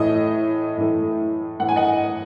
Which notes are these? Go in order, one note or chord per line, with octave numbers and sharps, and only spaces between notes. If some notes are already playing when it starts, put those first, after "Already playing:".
Already playing: A2 E3 A3 D#5
A2 E3 A3
A2 E3 A3 F#5
G#5
D#5 F#5